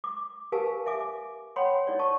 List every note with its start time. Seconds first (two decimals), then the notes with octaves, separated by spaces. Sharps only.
0.04 D6
0.52 G4 A#4 B4 F5 G#5 A5
0.86 E5 G#5 D6
1.56 C#5 F#5 G5 B5 C6
1.87 D#4 C#5 D5
1.99 C#5 A5 C#6